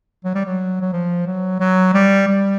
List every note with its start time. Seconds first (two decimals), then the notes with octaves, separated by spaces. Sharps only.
0.25 F#3
0.35 G3
0.45 F#3
0.81 F#3
0.93 F3
1.26 F#3
1.60 F#3
1.94 G3
2.28 G3